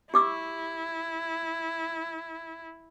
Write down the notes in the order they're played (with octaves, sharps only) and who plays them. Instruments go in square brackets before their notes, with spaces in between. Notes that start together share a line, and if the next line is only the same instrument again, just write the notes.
[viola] E4 [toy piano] G4 D6 E6